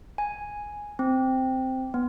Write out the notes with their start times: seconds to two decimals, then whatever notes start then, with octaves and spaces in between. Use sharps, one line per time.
0.18 G#5
0.99 C4
1.94 B3